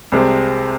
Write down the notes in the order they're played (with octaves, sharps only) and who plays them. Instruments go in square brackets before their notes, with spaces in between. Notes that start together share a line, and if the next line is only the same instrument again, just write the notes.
[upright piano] C2 C3 G#3 C4